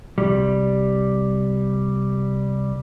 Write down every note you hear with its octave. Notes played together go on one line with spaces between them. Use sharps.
C2 G3